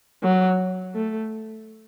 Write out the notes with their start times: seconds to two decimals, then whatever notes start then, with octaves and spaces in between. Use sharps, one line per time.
0.23 F#3
0.94 A3